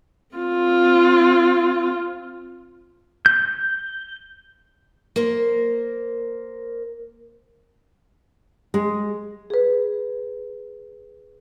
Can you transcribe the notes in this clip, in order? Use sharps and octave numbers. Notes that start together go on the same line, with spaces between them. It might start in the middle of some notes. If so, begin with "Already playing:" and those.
C4 F4
G6
A#3 A#4 C5
G#3
G#4 B4